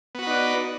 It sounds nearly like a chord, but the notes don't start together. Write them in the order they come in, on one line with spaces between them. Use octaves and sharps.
B3 F#4 B4 D#4 D5